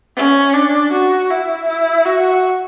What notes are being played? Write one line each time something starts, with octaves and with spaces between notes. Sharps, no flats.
C#4
D4
F#4
E4
E4
F#4